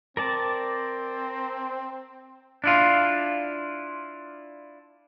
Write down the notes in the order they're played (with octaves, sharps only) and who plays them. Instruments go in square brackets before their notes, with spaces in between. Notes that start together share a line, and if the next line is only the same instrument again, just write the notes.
[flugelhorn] C4 [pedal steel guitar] A#4 D5 A5
[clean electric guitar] D4 E4 F4